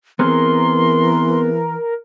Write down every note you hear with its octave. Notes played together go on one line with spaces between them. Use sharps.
E3 B3 C4 G#4 A#4 C6